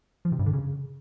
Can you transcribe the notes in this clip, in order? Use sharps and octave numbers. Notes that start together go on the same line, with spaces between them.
F3
C3
G2
D3
C#3